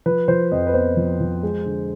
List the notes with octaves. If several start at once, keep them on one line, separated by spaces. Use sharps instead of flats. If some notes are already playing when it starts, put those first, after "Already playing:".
F3 B4
F3 C5
F2 D#5
B4
B3 C5
F3
F3
G#3
D3